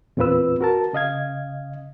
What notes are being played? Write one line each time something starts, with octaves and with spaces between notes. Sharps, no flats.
E2 A#2 C4 F4 B4 E6
F#4 A#4 A5
C#3 D#5 F5 G#6